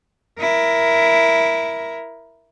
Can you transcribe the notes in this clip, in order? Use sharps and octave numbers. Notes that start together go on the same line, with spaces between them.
E4 A#4